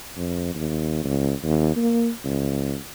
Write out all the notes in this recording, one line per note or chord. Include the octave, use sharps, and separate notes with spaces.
F2
D#2
C#2
D#2
A#3
C#2